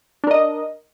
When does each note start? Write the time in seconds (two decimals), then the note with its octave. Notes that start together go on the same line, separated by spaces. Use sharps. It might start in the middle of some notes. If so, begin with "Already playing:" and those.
0.24 D4
0.27 A#4
0.31 D#5